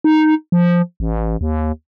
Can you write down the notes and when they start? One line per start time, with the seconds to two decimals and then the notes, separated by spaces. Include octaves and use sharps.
0.04 D#4
0.52 F3
1.00 A1
1.41 D#2